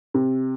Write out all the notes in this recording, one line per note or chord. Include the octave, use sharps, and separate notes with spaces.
C3